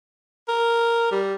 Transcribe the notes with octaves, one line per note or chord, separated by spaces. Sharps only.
A#4
G3